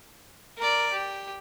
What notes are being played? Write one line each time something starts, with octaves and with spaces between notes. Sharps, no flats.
A#4 D5
G4